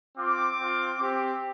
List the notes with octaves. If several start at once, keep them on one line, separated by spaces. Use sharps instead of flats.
C4 F4 D6
C4 F4
C4 G4